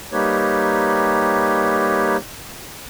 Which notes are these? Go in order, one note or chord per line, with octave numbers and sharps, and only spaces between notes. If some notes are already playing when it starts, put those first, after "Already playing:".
G3 A#3 D#4 G4 B4 C#5